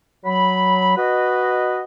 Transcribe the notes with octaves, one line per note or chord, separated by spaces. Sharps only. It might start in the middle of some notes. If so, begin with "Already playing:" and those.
F#3 B5
F#4 B4 D#5